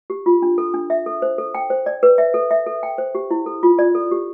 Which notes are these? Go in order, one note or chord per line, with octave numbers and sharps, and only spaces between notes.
G4
F4
D4
A4
D4
E5
A4
C5
A4
G5
C5
D5
B4
E5
A4
E5
A4
G5
C5
G4
E4
A4
F4
D5
A4
G4